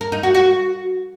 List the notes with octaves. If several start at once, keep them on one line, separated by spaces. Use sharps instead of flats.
A#4
D#4
F#4
F#4